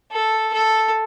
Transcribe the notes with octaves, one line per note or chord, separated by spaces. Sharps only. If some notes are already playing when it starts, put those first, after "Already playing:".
A4
A4